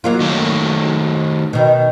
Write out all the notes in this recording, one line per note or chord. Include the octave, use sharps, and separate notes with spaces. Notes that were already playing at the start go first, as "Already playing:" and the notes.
F#3 A#3 F4
D#3 A3 C#5
B2 D#3